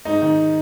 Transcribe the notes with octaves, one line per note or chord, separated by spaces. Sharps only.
G#2 D#4
D#3